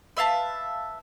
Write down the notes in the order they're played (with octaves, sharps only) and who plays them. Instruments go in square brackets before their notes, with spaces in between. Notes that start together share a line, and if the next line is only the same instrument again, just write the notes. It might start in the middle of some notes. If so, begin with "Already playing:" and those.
[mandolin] B4 E5 F5 A5